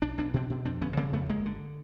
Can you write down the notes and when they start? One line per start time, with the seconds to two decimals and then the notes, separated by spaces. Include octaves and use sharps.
0.02 B1 D4
0.18 B1 D4
0.34 B2 C4 D4
0.50 B2
0.65 F2 C4 D4
0.81 G1 B3 C#4
0.97 C#3 A#3 C4
1.13 F2 A3 B3
1.29 G1 G#3 A#3
1.46 D3